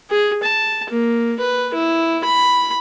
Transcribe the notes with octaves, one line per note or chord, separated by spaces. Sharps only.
G#4
A5
A#3
B4
E4
B5